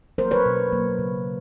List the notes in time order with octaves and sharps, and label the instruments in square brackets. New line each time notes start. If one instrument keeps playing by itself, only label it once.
[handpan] F#3 A#3 A#4 C5
B4 C#5
B2
F#3 A#3
C#3